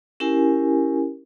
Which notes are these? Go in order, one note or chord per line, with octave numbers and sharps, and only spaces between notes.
C#4 E4 G4 A#4 G#5